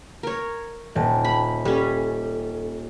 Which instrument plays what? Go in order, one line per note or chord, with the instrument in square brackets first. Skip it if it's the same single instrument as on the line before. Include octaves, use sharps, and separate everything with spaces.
[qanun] A#4 C#5
[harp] D#1 [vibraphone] G5 A5
[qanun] B5
[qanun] G3 C#4 [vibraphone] A4